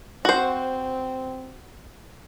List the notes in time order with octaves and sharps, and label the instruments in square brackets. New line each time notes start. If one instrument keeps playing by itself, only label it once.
[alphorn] C4 [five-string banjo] F#4 C5